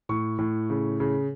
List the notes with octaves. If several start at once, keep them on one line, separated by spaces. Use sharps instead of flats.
A2 C#6
A2
C#3
C#3